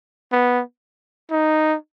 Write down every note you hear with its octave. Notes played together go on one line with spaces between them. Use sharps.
B3
D#4